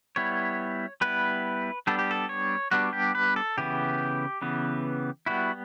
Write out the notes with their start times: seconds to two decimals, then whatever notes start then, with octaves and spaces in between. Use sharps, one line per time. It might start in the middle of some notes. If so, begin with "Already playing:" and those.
0.16 G3 B3 E4 C#5
1.01 G3 B3 E4 B4
1.87 G3 B3 D4 A4
1.99 G4
2.11 A4
2.29 C#5
2.71 G3 B3 D4 F#4
2.93 G4
3.15 B4
3.36 A4
3.57 C#3 E3 B3 G4
4.42 C#3 E3 B3
5.26 G3 B3 E4 F#4